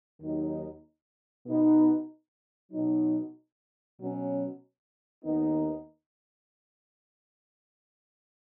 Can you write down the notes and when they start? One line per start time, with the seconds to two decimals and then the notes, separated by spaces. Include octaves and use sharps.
0.21 D#2 D#3 F#3 D#4
1.46 B2 B3 D#4 B4
2.72 B2 F#3 D#4
3.98 B2 F#3 C#4
5.24 D#2 D#3 B3 D#4